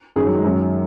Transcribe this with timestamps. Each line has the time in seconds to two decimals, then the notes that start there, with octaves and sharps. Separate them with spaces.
0.16 F#2 D#3 G#4
0.25 F#3
0.35 G#3
0.44 F#2 D#3 F#3